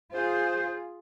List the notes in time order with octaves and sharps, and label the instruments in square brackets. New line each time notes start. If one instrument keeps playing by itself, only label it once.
[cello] F4 G#4 [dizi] C5